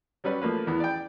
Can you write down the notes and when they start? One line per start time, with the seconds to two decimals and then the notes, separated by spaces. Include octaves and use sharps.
0.24 F#3 G3 C#4 B4
0.42 F3 A3 A#3 B4
0.67 E2 E3 B3
0.80 D5 G5